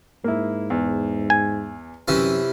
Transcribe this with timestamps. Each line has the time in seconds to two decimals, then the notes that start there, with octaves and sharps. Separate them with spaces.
0.24 G#2 A#3 E4
0.70 E2
1.30 G#5
2.08 F#2 C3 E3 C#4